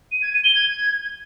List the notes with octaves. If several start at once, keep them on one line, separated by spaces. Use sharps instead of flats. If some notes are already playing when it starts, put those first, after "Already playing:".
D#7
G#6
D#7
G7
G#6